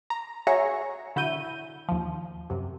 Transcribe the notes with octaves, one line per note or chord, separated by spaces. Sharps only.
A#5
F#4 G#4 C#5 E5 A#5 C#6
D3 E4 F#4 G6 D#7
D#2 F3
F#2 C3